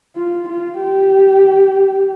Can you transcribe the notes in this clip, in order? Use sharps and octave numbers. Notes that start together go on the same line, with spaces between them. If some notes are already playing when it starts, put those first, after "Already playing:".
F4
F4
G4